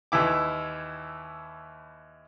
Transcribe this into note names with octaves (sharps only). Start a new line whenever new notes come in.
D#2 E3 E4 D6